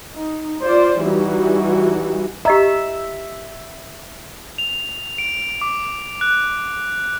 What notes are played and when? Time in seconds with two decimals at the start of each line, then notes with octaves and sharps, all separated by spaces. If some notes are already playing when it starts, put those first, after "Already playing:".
0.13 D#4
0.62 F4 C5 D5
1.00 E3 G3 D#4 F#4
2.45 G4 D#5 E5 A#5
4.58 F7
5.18 D7
5.61 D6
6.21 F#6